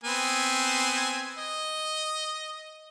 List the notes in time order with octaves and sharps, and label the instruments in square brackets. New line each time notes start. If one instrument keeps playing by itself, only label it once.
[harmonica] B3 C4 G#5
D#5